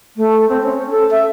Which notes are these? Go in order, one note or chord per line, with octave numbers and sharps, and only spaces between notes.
A3
C4
C#4
A4
E5